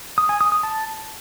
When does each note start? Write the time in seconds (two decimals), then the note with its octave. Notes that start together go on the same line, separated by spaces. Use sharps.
0.18 D#6
0.29 G#5
0.41 D#6
0.52 D#6
0.63 A5